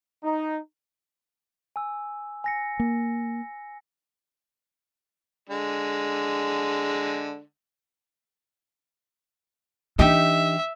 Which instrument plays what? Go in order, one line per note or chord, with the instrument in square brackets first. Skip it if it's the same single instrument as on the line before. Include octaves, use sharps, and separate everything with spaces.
[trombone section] D#4
[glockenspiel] G#5 E6
G#5 A#6 C#7
[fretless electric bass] A#3
[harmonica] D3 G#3
[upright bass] E3 D4 [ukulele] D#4 G4 [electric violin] E5